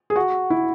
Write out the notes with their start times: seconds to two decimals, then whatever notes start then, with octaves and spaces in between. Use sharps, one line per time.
0.10 G#4
0.16 F#4
0.50 E4